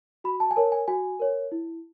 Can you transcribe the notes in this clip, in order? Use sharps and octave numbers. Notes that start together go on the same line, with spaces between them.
F#4 B5
A5
G#5
A#4 C#5 A5
G#5
F#4 G#5
A#4 C#5
E4